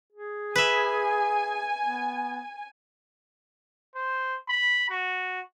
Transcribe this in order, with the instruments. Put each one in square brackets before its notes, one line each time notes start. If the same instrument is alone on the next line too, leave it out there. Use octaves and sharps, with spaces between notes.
[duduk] G#4
[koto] B4 E5 [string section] G#5
[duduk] B3
[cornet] C5
B5
F#4